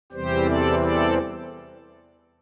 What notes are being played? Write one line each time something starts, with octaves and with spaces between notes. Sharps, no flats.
E2 C3 E3 G3 C4 G4 C5
A4 D5
A4 D5